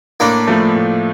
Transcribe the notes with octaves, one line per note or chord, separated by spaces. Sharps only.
A2 A#3 D4
F3 A3
A2